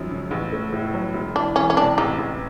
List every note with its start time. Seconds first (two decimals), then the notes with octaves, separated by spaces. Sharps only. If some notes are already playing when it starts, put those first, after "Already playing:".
Already playing: G#1 F#2 F3
0.10 C#3
0.31 A1
0.52 A3
0.73 A2
0.94 F#3
1.14 E1
1.35 E3 D4
1.56 E2 C#4
1.70 C#4
1.77 C3 D4
1.98 A1 D#4
2.18 A1